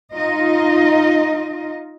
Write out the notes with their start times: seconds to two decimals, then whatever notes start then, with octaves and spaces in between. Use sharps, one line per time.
0.14 D#4 F4 D#5